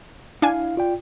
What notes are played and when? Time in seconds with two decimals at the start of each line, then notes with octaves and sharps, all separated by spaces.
0.42 D4 E4 F5 G#5
0.77 F4 D5 G5